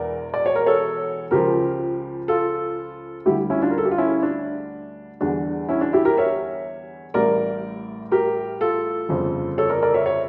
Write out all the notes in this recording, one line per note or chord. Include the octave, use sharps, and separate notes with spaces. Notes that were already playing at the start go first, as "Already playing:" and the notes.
Already playing: E1 E2 E3 A#4 D5
D5
C#5
A#4
A4 C#5
C#2 C#3 F3 G4 A#4
F4 A4
D2 D3 G3 E4 G4
C#4 E4
D4 F4
A#4
A4
G4
F4
C#4 E4
D4
E2 D3 G3 D4
C#4 E4
D4
E4 G4
G4 A#4
C#5 E5
A1 A2 G3 A#4 D5
G4 A#4
F4 A4
G1 F2 C#3
A4 C#5
A#4 D5
A#4 D5
C#5 E5
C#5 E5